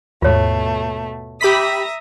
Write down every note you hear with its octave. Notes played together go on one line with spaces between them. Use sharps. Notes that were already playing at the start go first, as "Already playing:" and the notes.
D#2 G#2 B2 A3 F4 C#5
G4 E5 A#5 B5 D#6 B6